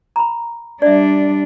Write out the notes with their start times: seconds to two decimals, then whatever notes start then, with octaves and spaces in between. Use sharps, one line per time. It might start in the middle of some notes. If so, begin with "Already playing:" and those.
0.16 A#5 B5
0.82 G3 D4 D5 E5